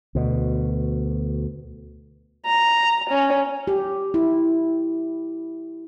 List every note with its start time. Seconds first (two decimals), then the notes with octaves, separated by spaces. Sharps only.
0.15 D2 B2
2.46 A#5
3.10 C#4
3.67 G4
4.14 E4